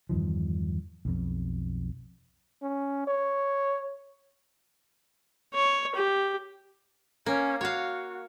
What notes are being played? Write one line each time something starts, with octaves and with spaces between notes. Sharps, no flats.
E2 G2 D#3 F3
B1 F2
C#4
C#5
C#5
G4
A#3 C#4
F#4 C#5 F5